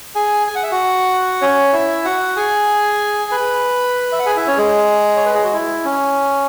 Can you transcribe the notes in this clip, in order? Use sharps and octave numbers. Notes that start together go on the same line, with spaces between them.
G#4 G#5
G#5
F#5
E5
F#4 F#5
C#4 C#5
E4 E5
F#4 F#5
G#4 G#5
B4 B5
E5
F#5
G#4 G#5
E4 E5
C#4 C#5
G#3 G#4
C#5
B4
G#4
F#4
E4
C#4